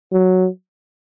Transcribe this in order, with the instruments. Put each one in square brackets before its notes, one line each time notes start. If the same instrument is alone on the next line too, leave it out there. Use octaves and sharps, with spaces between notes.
[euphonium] F#3